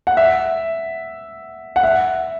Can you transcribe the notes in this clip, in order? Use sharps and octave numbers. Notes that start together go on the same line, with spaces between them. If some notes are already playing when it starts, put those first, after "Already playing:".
F#5
E5
F#5
E5